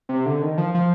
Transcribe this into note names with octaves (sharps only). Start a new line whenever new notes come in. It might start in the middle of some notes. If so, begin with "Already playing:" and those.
C3
D3
D#3
F3
F3